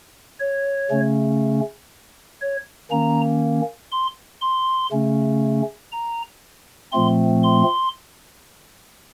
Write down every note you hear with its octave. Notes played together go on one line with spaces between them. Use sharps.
C#5
C#3 A3 C#4
C#5
D#3 A#3 C#4 A#5
C6
C6
C#3 A3 C#4
A#5
A#2 F3 A3 C4 C6
C6